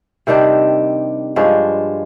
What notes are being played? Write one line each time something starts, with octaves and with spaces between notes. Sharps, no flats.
C3 D#3 G3 D4
G2 F3 G#3 D4